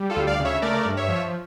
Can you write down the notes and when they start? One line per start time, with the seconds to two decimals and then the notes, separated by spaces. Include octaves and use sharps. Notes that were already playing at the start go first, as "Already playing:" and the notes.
Already playing: G3
0.10 F4 A4
0.16 D2
0.27 D5 F5
0.40 C#3
0.45 C#5 E5
0.62 A3 A#4 D5
0.85 G2
0.97 C#5 E5
1.09 F3